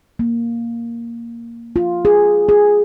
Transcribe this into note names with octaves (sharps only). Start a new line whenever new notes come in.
A#3
F4
G#4
G#4